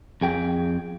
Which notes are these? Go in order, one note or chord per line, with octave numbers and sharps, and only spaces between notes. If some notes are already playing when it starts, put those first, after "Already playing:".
F2 G#4 G5